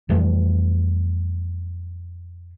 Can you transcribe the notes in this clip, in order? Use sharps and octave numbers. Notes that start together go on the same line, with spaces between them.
F2 E3 G3 A3